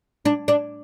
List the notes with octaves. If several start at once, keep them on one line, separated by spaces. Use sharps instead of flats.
D4
D4